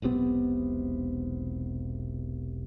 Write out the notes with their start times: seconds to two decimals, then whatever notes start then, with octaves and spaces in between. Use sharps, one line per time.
0.02 E1 B1 C3 B3